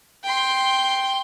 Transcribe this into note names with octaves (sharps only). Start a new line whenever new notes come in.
G5 C6